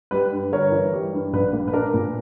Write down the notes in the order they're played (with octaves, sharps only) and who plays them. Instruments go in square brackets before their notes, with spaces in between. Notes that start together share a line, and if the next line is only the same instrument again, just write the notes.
[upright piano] G3 B4
G2
G1 A#4 C#5
E3
G3
G2
A#1 B4
A#3
B4
D4 A#4
A#2